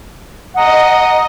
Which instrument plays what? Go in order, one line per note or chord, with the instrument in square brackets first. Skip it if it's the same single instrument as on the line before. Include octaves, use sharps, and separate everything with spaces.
[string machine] D#5 [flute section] F#5 A#5 D#6